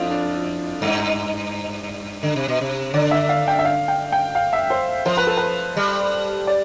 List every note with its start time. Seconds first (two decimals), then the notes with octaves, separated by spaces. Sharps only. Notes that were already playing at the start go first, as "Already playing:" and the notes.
Already playing: F2 D4 E4 F4
0.10 D4
0.82 G2
2.23 D3
2.36 C3
2.48 B2
2.61 C3
2.94 D3 D5
3.11 E5
3.29 F5
3.48 G5
3.59 E5
3.65 F5
3.88 G5
4.12 G5
4.35 F5
4.53 E5
4.70 C5
5.06 F3 C5
5.17 B4
5.27 A4
5.37 B4
5.77 G3
6.47 D5